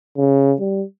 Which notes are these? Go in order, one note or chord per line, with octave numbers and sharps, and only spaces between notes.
C#3
G3